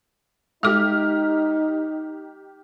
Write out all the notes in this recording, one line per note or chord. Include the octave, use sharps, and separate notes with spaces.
G#3 D#4 G4 A4 D6 F6